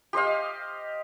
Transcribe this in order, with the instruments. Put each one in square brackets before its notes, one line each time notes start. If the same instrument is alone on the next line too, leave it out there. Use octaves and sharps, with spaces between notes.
[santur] G4 C5 D#5 F5